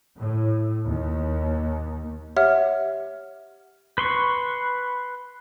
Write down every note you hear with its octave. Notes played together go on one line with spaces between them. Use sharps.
A2
D#2
G4 C#5 E5 F#5 F6
B4 C6 C#6